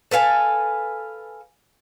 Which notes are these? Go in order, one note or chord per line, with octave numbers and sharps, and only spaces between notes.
A4 B4 F5 G#5